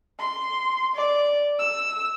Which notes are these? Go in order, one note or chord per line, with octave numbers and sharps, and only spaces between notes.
C6
D5
E6